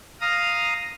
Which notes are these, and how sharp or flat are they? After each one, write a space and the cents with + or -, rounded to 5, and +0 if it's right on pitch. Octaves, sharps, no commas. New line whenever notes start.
F5 +0 A#5 +0 D#6 +0